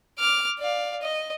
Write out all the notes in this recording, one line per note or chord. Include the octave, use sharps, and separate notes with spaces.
D6 F6
D5 F5
D#5